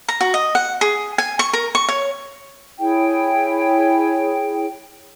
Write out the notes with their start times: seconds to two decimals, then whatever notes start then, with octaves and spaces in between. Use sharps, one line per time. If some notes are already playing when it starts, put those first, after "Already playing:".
0.08 A#5
0.21 F#4
0.34 D#5
0.55 F#5
0.81 G#4
1.18 G#5
1.39 C#6
1.53 A#4
1.75 C#6
1.89 C#5
2.79 E4 G#4 C#5 G5